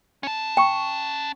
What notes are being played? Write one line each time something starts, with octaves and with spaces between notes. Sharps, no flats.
C#4 A5
G5 C#6